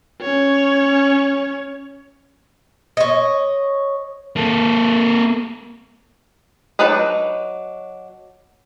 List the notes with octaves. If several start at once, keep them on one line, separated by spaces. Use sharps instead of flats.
C#4 C#5
C#5 D#5
A#3 A4
F#3 D4 D#4 B4 D#5